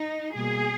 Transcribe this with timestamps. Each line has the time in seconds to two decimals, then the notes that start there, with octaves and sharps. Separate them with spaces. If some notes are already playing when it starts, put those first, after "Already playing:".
Already playing: D#4
0.35 B2 G3 A#3 G#4